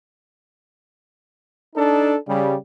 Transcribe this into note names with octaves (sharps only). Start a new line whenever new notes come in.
D4 D#4 A4
C#3 G3